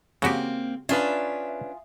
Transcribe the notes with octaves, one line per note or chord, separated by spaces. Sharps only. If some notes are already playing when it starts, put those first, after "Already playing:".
C#3 A#3 C4 F#4 G4
C#4 D4 F4 G#4 B4 E5